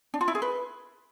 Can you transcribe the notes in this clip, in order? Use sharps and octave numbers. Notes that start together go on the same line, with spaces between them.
D4
F4
E4
G#4
B4